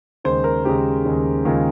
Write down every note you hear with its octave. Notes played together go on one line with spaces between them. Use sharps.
D#2 C#3 G#3 C5
A#4
D#2 C#3 G#3 G4
D#2 C#3 G#3
D#2 C#3 G#3 F4